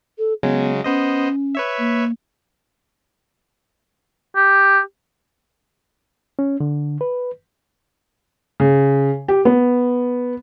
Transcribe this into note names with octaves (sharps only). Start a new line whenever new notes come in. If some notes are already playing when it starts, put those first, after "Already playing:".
A4
C#3 F#3 G#3 B3
B3 C#4 C5 D#5
B4 C#5 E5
A#3
G4
C#4
D3
B4
C#3
G4
B3